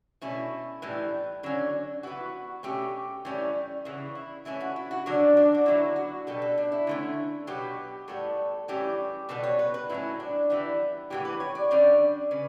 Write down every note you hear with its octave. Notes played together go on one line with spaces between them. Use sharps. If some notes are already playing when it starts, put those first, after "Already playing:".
B2 A3 C#4 E4
A2 E3 G3
D3 F#3 C#4
E3 B3 F#4
B2 A3 C#4 G4
A2 E3 G3 C#4
C#3 E3 B3 C#4
E4
E3 A3 C#4 E4
F#4
E4
F#4
D3 F#3 C#4 D4
D4
F#4
D3 F#3 B3 E4
F#4
B2 G3 B3 A4
A4
D4
E4
D3 A3 C#4
B2 F#3 B3 G4
A2 G3 B3 A4
A2 E3 G3 C#4 G4
B2 G3 B3 A4
C#5
B4
B4
A2 F#3 C#4 E4
D4
E3 G3 B3 E4
A2 E3 B3 G4
B4
C#5
D5
D3 G3 C#4 D5
C#3 B4